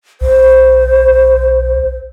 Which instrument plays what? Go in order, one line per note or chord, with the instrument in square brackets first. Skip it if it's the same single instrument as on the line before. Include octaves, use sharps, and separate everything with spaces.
[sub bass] B1 [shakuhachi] C5